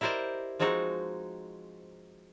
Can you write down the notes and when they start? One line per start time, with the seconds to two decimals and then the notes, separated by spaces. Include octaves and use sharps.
0.01 E4 G4 A#4 C5 D5 D#5
0.59 F3 G#3 C4 D#4 F#4